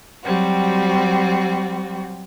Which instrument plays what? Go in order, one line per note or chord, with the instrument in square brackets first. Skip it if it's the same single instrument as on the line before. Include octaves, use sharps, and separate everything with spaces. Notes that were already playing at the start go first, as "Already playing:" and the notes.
[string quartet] F#3 G3 C4 F#4